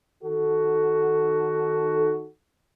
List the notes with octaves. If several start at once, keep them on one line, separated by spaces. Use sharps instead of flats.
D#3 D#4 F#4 A4